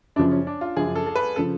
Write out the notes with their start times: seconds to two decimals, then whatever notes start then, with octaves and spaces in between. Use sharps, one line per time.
0.16 F#2 C#3 F3 D4
0.31 C#4
0.47 D4
0.61 F4
0.77 F#2 C#3 F3 G#4
0.96 A4
1.06 A4
1.15 B4
1.36 C#3 F3 A4